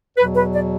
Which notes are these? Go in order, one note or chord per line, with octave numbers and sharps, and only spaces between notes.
E2 B2 F#3 B4
B4
D5